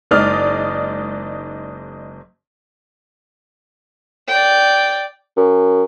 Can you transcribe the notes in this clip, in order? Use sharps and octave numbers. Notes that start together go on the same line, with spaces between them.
F#1 G#3 D#4 D5 D#6 F6
D5 G5
F#2